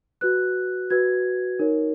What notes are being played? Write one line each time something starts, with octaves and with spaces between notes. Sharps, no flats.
F#4 B4 F#6
F#4 B4 G#6
D#4 A#4 C#5